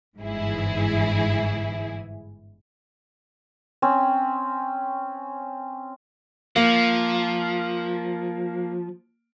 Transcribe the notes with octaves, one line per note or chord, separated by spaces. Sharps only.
G1 G#2 E3 E4 G#4
C4 C#4
F3 A#3